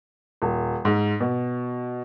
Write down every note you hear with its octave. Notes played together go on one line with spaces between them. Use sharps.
D#1
G#2
B2